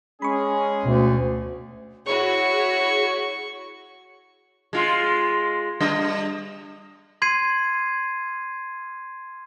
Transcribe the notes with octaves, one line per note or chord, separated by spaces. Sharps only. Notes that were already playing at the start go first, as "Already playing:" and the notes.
G#3 C#4 G#4 B5 C#6
D2 B2
E4 F#4 G#4 C#5 C#6
G#3 F4
G3 D4 D#5
C6 G#6 C7 D#7